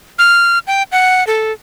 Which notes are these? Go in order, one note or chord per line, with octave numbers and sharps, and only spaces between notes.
F6
G5
F#5
A4